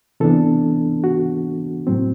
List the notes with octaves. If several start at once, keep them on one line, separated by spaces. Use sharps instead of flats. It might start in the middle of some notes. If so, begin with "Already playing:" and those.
C3 E3 B3 D4 A4
F#4
A2 F#3 C4